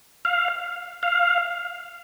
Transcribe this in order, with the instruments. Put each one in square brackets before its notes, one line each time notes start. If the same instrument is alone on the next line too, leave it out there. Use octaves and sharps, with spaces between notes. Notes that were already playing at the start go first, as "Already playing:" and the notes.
[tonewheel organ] F5
F5